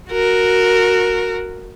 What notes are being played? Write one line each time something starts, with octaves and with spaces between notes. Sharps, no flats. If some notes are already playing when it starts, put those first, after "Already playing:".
F#4 A#4